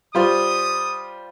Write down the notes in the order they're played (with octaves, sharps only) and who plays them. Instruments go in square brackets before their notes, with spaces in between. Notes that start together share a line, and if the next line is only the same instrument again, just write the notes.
[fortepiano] G3 F4 C5 [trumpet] D#6